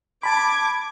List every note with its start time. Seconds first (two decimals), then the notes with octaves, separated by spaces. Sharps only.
0.23 A5 B5 D6 G#6